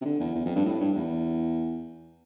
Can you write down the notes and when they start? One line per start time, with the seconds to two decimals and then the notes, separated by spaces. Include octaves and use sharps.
0.01 C3
0.05 D3
0.20 E2
0.35 E2
0.45 F2
0.56 G2
0.65 A2
0.80 G2
0.96 E2